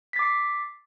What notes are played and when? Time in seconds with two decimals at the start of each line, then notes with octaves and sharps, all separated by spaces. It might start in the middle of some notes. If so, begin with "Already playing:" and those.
0.13 B6
0.16 A6
0.19 D6
0.22 C7